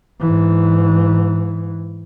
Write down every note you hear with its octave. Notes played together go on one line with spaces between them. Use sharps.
G#2 E3